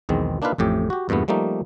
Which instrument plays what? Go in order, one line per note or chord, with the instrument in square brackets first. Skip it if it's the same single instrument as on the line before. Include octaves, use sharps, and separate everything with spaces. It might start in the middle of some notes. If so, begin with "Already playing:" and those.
[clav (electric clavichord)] B1 E2 D#3 G#3 C4
A#3 D4 D#4 F4 B4 F5
A1 F2 A2 G4
F#4 G4
E2 G2 A#2 A3 B3
F3 G3 A3 A#3 D#4